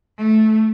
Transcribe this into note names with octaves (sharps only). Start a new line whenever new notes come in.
A3